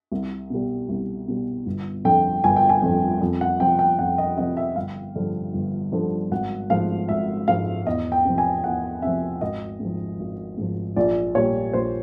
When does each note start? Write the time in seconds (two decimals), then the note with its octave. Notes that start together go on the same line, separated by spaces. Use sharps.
0.12 C2
0.50 B2 G3
0.89 C2
1.28 B2 G3
1.66 G1
2.05 F2 D3 F3 G5
2.44 G1 G#5
2.56 G5
2.69 G#5
2.82 F2 D3 F3
3.21 F2
3.41 F#5
3.59 C3 F3 G5
3.79 G5
3.99 F2 F#5
4.18 D#5
4.37 C3 F3 D#5
4.57 E5
4.76 G1 F5
5.16 G2 D3 F3
5.54 G1
5.92 G2 D3 F3
6.31 G#1 F#5
6.70 G#2 F3 F5
7.09 G#1 E5
7.48 G#2 F3 F5
7.86 E2 D#5
8.12 G5
8.25 C3 F3
8.38 G#5
8.64 E2 F#5
9.02 C3 F3 E5
9.41 G#1 D#5
9.80 G#2 F3
10.19 G#1
10.58 G#2 F3
10.96 A#1 D5
11.35 A#2 G3 C#5
11.73 A#1 C5